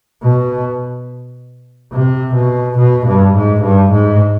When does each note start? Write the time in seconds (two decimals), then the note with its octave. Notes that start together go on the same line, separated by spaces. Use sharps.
0.23 B2
1.92 C3
2.34 B2
2.77 B2
3.06 G2
3.34 G#2
3.62 G2
3.91 G#2